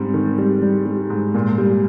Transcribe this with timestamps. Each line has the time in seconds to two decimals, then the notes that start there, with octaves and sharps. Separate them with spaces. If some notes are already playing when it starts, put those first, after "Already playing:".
Already playing: G#2 G3 C4
0.14 D#3
0.38 G3
0.62 G3
0.86 G3
1.10 G#2
1.34 A#2
1.58 G3